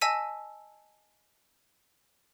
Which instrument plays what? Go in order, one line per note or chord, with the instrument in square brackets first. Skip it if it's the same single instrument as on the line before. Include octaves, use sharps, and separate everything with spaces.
[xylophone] D#5 G#5 A5 E6 B6 D#7